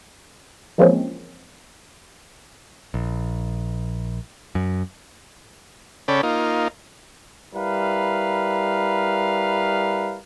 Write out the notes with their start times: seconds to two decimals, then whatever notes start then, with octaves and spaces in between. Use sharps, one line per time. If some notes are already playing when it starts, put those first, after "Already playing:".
0.78 E3 F3 G#3 A#3 C4 C#4
2.94 A#1
4.55 F#2
6.08 C#3 C#4 A4 D5 G5 B5
6.23 A#3 D#4 F4
7.54 G3 E4 A#4 B4 F5